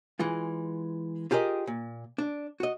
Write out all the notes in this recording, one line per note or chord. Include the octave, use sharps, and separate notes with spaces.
E3 G#3 F4
F4 G4 G#4 A#4 D#5
A#2
D4
F#4 D#5